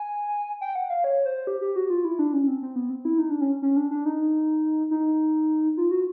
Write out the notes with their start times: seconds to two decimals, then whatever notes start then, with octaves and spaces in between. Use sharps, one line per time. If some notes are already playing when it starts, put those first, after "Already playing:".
Already playing: G#5
0.61 G5
0.75 F#5
0.90 F5
1.04 C#5
1.25 C5
1.47 G4
1.61 G4
1.76 F#4
1.90 F4
2.05 E4
2.19 D4
2.33 C#4
2.48 C4
2.62 C4
2.76 B3
2.90 C4
3.05 E4
3.18 D#4
3.30 D4
3.41 C#4
3.62 C#4
3.76 D4
3.91 D4
4.05 D#4
4.91 D#4
5.77 F4
5.91 F#4